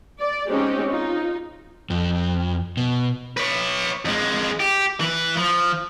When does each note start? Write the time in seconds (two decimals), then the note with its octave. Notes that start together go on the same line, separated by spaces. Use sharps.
0.20 D5
0.49 G#3 C4 C#4 D#4 G4
0.90 D#4 F4
1.90 F2
2.77 B2
3.37 B4 C#5
4.05 F2 G#3
4.60 G4
5.00 E3 B4
5.37 F3